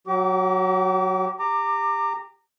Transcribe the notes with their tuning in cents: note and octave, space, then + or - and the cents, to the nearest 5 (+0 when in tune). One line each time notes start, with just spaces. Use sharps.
F#3 +0 G4 -45 D6 -20
G4 +20 A#5 -20 D6 +15